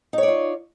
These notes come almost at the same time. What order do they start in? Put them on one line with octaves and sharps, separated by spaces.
D#4 C#5 D5 F4